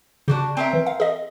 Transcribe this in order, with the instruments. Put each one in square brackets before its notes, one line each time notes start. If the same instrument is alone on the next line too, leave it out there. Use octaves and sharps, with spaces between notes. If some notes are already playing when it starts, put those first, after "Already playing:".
[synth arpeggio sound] C#3 [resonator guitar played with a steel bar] D4 F#4 G4
[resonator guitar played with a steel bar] C4 A#4 E5 [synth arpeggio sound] G5
[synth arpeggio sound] E3
F5
G#4 D#5